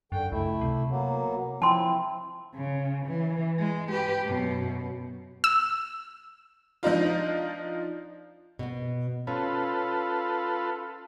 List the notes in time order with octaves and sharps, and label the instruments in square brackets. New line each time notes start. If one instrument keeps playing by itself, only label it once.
[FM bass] F#2 [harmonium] D3 G5
[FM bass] C#2 [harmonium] A3 E4
[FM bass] C3
[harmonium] F#3 A#3 B3
[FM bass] F3 [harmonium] C4 E4 [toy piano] A5 C6
[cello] C#3
E3
G#3
G4 B4
F#2 B2
[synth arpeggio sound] E6
[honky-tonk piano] F3 D4 D#4 F4
[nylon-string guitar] B2 B3
[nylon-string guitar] C#4 [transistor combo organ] F4 A4 B4